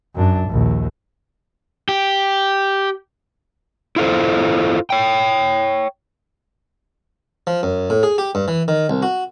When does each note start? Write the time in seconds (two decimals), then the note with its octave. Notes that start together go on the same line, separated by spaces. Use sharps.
0.16 F#2 D4
0.50 A#1 D#2
1.89 G4
3.96 E4 F4 A4 C5
4.90 C#5 G5
7.47 F3
7.63 F#2
7.90 A2
8.03 G#4
8.18 G4
8.35 G2
8.48 E3
8.68 D#3
8.90 C2
9.02 F#4